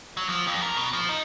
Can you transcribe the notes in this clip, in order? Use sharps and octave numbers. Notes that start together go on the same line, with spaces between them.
F#3
F3
F2
A#4
B2
F3
D#4